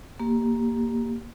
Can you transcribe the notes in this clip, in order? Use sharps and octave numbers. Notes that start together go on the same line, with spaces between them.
A#3 G4